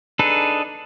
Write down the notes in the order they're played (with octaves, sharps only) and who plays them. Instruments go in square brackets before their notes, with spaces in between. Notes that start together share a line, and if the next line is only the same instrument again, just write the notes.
[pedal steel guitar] D4 D#4 G#4 A4 B4